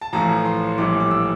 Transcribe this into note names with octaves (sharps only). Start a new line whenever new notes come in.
A5
A1 A2 F3 A#5
C6
A#1 A2 E3 G3 D6
D6
E6